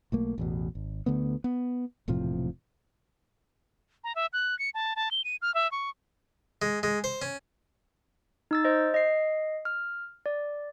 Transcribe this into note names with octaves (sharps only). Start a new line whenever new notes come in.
B1 A3 A#3
A1 E2 B2
G#1
D2 D3 A3 B3
B3
E1 A2 C3 F3
A#5
E5
F#6
C#7
A5
A5
G7
D#7
F6
E5
C#6
G#3
G#3
C5
C#4
D#4 E6 A6
C5 D#5
D#5 C7
F6
D5